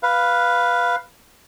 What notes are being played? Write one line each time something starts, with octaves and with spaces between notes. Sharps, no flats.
B4 F5